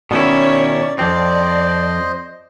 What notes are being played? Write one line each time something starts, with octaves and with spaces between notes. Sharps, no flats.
B2 D#3 C#4 E4 C#5 D5
F2 F3 C4 C5 D5 D#5